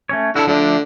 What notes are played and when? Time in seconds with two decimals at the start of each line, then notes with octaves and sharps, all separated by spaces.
0.09 A3 C#4 C#5
0.36 D3 E4 F#4 A4
0.47 D3 F3 A3 D4